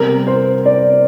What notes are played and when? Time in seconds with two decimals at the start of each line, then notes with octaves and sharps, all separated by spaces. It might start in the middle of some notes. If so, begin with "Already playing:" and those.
Already playing: C3 G3 A#4
0.27 C5
0.65 D5